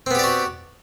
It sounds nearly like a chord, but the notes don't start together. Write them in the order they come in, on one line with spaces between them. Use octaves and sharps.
C4 B3 G4 D5 F#4